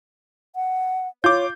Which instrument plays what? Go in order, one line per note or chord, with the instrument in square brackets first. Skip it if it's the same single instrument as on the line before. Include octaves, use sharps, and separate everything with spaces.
[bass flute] F#5
[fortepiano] F4 [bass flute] C#5 [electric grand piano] D6 G6